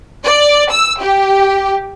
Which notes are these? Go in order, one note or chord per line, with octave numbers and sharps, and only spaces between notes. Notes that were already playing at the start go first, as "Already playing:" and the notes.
D5
E6
G4